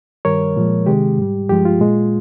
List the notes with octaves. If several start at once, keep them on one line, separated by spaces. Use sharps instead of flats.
G2 D#3 G3 A#4 C#5
A#2 F3 G#3
C3 D#3 G#3 G4
G#2 G3
G2 F3 G#3 G4
F4
A#2 G#3